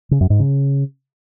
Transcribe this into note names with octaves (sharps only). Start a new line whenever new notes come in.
C#3
F#2
G#2
C#3